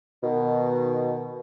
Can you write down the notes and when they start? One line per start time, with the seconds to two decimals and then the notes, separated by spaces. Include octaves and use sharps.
0.23 B2 D#3